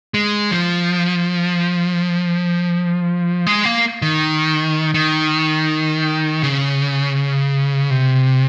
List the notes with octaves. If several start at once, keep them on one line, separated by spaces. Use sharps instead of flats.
G#3
F3
G#3
A#3
D#3
D#3
C#3
C3